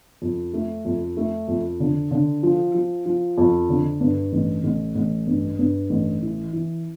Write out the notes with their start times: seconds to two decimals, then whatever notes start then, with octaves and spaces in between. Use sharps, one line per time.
0.22 F2
0.54 A3
0.85 F2
1.17 A3
1.48 F2
1.80 D3
2.11 D3
2.43 F3
2.74 F3
3.06 F3
3.38 F2
3.69 D3
4.01 G2
4.32 A1
4.64 A1
4.95 A1
5.27 G2
5.59 G2
5.90 A1
6.22 E3
6.53 E3